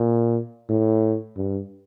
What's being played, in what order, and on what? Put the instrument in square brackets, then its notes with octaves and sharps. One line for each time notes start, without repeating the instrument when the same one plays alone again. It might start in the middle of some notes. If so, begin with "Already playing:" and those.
Already playing: [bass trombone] A#2
A2
G2